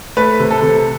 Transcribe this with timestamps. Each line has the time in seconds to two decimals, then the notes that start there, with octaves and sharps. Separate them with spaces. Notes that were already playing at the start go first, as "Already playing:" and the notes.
0.17 A3 B4
0.40 C3
0.51 A4
0.62 C3